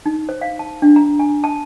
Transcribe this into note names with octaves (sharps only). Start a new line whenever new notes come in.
D#4
C5
F5
A5
D4
A#5
G#5
A5